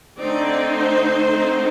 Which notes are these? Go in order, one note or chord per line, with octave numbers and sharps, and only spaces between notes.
D3 A3 C4 D#4 D5
C5
D3 A3 C4 D#4